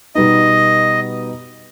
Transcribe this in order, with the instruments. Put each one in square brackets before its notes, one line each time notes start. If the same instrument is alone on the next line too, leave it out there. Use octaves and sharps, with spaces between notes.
[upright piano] B2 G3 B3 D#4 [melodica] D#5